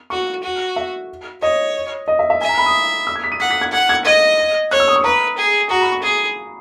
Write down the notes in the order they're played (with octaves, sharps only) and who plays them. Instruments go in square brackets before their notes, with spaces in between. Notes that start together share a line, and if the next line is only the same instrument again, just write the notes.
[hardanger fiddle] F#4 [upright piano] C#6
[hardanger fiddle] F#4
[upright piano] E5
[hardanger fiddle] C#5 [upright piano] D#5
[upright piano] D#5
E5
E5
[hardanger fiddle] E5 [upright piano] G#5
[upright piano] A#5
B5
D#6
E6
G#6
B6
D#7
[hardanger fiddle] F#5 [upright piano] B6
[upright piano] B6
G#6
[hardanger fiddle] F#5 [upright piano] G#6
[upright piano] G#6
[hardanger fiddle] D#5 [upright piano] G#6
[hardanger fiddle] C#5 [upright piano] F#6
[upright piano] E6
D#6
C#6
[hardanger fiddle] B4 [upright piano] A#5
[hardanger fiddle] G#4
[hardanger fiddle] F#4 [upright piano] A#5
[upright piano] B5
C#6
[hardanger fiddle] G#4 [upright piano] D#6